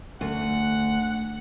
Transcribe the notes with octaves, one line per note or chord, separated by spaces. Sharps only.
D2 F#5